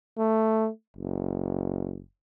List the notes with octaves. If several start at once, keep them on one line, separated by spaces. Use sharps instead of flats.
A3
F#1